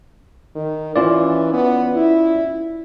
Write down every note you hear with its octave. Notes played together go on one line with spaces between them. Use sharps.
D#3
E3 C#4 F4 D5
B3
E4